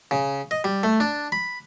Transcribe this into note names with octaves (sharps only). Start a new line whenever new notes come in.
C#3
D#5
G3
A3
D4
B5